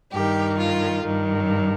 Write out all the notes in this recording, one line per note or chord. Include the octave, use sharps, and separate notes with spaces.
G2 D#3 G4
F4
G2 D#3